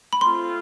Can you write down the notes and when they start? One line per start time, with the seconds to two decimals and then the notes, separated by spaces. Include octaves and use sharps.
0.13 B5
0.21 A3 C4 F4 C6